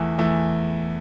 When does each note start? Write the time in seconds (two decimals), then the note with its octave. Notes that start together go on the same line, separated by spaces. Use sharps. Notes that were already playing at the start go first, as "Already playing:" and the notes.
Already playing: E2 E3 A3
0.18 E2 E3 A3